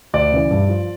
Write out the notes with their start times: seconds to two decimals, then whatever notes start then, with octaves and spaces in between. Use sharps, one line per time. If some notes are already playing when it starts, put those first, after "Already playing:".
0.13 D2 D5
0.32 C#3 E3
0.51 G2
0.69 F3